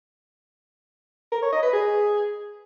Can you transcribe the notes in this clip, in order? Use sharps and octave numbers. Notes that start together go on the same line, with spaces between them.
A#4
C#5
D#5
B4
G#4